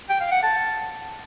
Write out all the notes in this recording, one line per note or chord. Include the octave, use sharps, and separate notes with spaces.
G5
F5
F#5
A5